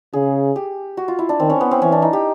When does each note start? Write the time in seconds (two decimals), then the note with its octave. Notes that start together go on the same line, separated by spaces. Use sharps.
0.13 C#3 G#4
0.56 G4
0.97 F#4
1.08 F4
1.19 E4
1.29 D4
1.40 D#3 C4
1.50 C#4
1.61 B3
1.71 C4
1.82 E3 C#4
1.92 D4
2.02 D#4
2.13 G4